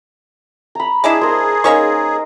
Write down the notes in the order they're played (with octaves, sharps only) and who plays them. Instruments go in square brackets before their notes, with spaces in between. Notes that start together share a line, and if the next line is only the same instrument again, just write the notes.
[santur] A#5 B5
[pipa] G#3 D4 E4 [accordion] G#4
[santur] A#4 C5
[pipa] A#3 C#4 C#6 [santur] D#4 A#4